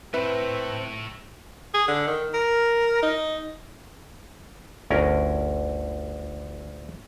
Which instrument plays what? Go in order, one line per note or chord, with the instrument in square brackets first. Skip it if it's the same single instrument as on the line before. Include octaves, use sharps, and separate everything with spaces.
[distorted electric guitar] A2 A3 [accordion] C4 [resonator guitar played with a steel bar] E4 [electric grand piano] B4
[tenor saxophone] G#4
D3
D#3
A#4
D#4
[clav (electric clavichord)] G1 D2 C#4 A#4